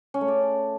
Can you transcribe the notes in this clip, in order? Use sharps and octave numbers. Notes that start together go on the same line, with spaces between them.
C#4
A3
D5